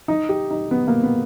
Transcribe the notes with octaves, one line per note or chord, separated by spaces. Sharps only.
D#4
G4
D#4
B3
A#3
B3